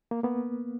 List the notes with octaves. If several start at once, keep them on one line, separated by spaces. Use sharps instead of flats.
A#3
A#3 B3